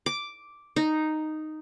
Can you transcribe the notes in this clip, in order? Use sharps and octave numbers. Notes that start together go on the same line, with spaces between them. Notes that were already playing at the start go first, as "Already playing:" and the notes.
D6
D#4